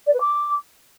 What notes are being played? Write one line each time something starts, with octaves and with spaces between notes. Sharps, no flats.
D5
B4
D6